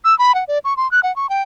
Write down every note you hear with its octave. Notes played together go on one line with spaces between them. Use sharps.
E6
B5
F#5
D5
C#6
C6
F#6
F#5
C#6
G5